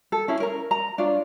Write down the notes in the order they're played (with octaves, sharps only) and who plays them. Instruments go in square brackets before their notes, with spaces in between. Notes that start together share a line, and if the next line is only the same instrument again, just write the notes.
[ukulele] A4
C#4 E4 G#4
A#4 A#5
A#5
D4 F4 C#5